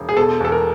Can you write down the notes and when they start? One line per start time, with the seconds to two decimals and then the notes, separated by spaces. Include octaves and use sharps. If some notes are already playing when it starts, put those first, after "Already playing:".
Already playing: E1
0.09 G#4
0.17 B2 A4
0.40 E2 A4
0.52 A#4